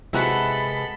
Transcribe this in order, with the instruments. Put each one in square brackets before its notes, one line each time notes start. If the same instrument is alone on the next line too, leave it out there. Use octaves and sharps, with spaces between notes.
[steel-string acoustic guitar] C3 G#3 B3 [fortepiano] E4 F#4 [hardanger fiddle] A4 B5